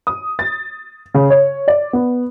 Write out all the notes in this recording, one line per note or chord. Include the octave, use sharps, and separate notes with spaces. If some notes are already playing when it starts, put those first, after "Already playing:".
D#6
A6
C#3
C#5
D5
B3